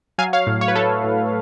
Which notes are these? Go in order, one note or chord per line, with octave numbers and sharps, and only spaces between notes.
F#3 F5 G#5
C#5 F5
A2
C#5
B4
A3 A4 C#5
A2